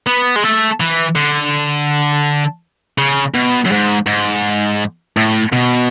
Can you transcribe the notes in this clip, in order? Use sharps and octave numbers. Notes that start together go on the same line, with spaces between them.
B3
G#3
A3
E3
D3
C#3
B2
F#2
G#2
G#2
A2
B2